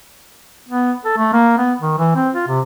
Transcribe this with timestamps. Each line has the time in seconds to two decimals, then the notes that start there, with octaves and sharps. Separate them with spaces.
0.68 B3
1.05 A4
1.17 A3
1.33 A#3
1.58 B3
1.81 D#3
1.98 E3
2.15 C4
2.35 F4
2.48 C3